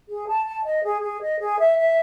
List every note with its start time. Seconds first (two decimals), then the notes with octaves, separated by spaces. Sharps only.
0.08 G#4
0.27 A5
0.45 A5
0.65 D#5
0.83 G#4
1.02 G#4
1.21 D#5
1.41 G#4
1.59 E5
1.78 E5